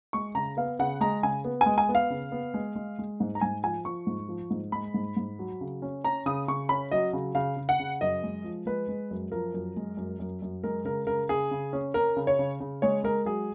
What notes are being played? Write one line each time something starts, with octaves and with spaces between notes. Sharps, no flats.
G#3 C#6
C#3 A#5
B3 F5
C#3 F#5
G#3 A#5
C#3 G#5
B3
G#5
G#3
G#5
B3
F5
C#3
B3
G#3
G#3
G#3
G#2
A#5
G#2 G#5
F3 G#5
F3 C#6
G#2
F3
G#2
G#3 B5
G#2
G#2
F#3
C#3
C#4
C#4 A#5
C#3 D#6
C#3 C#6
C#4 B5
F#3 D#5
C#3
C#3 F5
C#3
F#5
C#3
F#2 D#5
G#3
F3
G#3 B4
G#3
F#2
F3 A#4
F#2
G#3
F#2
F#2
F#2
G#3 A#4
C#3 A#4
C#3 A#4
C#3 G#4
C#3
C#4
C#4 A#4
C#3
C#5
C#3
C#3
G#3 C#5
G#3 A#4
F#3 G#4